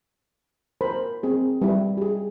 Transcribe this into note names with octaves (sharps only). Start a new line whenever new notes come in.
A#4 C5 B5
C4 G#4
G3 E4
G4 G#4